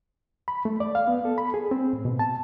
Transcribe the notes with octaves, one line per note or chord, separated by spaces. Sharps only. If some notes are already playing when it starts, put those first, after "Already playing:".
B5
A3
D5
F5
B3
A4
B5
G#4
C4
A2
B2
A5